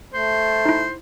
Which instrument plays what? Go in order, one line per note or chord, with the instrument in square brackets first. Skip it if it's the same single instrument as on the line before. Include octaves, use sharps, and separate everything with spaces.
[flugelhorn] A3 [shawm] C5
[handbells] D#4 E4